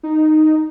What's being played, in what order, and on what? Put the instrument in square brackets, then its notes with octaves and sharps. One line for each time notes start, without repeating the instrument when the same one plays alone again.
[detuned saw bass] D#4